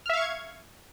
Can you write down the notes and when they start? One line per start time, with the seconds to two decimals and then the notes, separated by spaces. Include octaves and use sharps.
0.06 F6
0.09 E5
0.13 F5
0.17 C#6
0.21 G#6